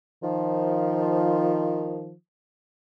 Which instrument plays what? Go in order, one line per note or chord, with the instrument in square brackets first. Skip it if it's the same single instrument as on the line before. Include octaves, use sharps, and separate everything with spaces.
[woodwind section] D#3 F3